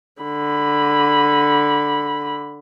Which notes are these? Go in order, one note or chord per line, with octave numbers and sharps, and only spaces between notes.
D3 B5